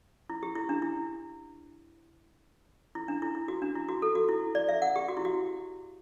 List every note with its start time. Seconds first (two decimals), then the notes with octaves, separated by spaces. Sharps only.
0.30 E4
0.43 G4
0.55 E4
0.69 D4
0.82 E4
2.95 E4
3.08 D4
3.22 E4
3.35 E4
3.48 F#4
3.62 D4
3.75 E4
3.89 F#4
4.02 A4
4.15 F#4
4.29 E4
4.55 D5
4.69 E5
4.82 F#5
4.96 G4
5.08 F#4
5.17 E4
5.25 F#4